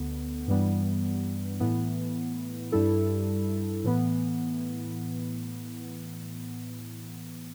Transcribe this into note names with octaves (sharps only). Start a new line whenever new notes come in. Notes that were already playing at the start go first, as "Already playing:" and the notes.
Already playing: D2 D3 B3
G2 E3 G3 B3
A2 E3 B3
G2 G3 E4 A4
A2 E3 B3